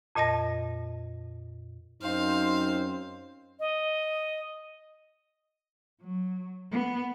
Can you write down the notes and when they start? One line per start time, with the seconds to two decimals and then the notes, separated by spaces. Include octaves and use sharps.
0.15 F2 A#2 D#5 A5 A#6
2.02 F#2 C4 D#4 C5 F5
3.60 D#5
6.01 F#3
6.72 B3